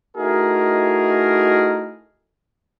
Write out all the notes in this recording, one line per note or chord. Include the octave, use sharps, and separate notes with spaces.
A3 D#4 E4 F#4 G#4 A#4